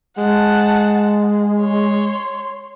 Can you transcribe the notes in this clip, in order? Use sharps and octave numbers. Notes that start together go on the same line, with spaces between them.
G#3 F#5 A5
C#5 C6